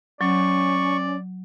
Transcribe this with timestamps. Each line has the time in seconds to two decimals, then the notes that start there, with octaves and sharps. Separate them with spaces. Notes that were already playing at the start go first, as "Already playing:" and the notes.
0.21 F#3 C#4 D5 C#6